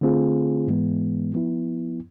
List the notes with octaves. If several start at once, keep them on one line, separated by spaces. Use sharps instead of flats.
D3 A3 C4 F4 G#4
G#2 E3 G#3 B3
F3 B3 E4